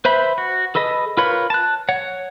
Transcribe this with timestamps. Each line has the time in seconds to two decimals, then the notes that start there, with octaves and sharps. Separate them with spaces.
0.05 B4 C5 E5 B5
0.38 F#4
0.75 G#4 A4 B4 D#5
1.17 F4 A#4 B4 C#5 B5
1.50 A5 F#6
1.89 C#5 F#5